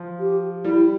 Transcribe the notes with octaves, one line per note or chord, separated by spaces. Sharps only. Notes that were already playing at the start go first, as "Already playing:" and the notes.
Already playing: F3
G4
G3 E4